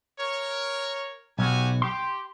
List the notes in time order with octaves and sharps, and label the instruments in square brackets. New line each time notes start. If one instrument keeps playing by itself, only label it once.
[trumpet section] A#4 C#5
[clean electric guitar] B1 [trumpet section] F#4 G4 G#5
[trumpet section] G4 [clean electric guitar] C6